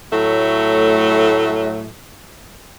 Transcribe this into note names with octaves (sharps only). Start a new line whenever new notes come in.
A2 F#3 A3